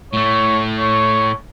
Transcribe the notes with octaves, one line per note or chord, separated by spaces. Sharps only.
A2 A3 C#5
C#5